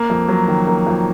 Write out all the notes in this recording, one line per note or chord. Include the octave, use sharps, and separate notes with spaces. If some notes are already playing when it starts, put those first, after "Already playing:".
Already playing: A#3
F2
F#3
D#3
A#3
F2